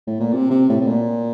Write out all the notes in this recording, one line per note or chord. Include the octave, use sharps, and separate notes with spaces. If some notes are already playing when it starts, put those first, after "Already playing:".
A2
A#2
C3
C3
A2
A2
A#2